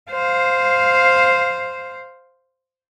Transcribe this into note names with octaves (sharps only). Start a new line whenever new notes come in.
C5 F5